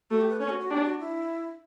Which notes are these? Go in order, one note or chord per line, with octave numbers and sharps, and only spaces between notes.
A3 F#4
G4
B4
C#4 C#5
F#4
F#4
D4 G4
F#4
E4